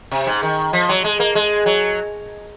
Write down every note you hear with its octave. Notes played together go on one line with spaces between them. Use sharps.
C3
G#2
D#3
F3
F#3
G#3
A#3
G#3
F#3